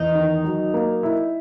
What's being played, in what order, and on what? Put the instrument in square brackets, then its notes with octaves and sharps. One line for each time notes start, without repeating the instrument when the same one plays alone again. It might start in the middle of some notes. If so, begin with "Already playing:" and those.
Already playing: [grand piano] E2 [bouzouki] D#4
[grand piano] D#3
F#3
A#3
E4